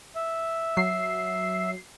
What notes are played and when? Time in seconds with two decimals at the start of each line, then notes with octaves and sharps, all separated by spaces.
0.16 E5
0.77 F#3 C7